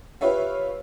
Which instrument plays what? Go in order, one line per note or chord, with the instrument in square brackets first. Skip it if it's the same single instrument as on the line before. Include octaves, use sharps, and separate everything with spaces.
[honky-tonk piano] F4 G4 B4 C#5 E5